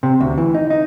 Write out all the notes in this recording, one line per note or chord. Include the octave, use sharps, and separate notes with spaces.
C3
D2
E3
D#4
D#4